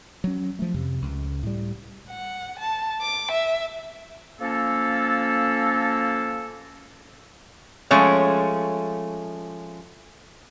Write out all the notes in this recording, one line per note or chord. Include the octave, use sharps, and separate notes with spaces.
F#3 C#4
F3 A3
F2 C3
C#2
A2 G3
F#5
A5
D6
E5
F3 A#3 C#4 A4
F3 G#3 A3 C#4 C#5